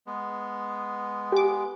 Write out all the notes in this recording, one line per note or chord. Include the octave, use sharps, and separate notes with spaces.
G#3 B3
G4 G#5 D6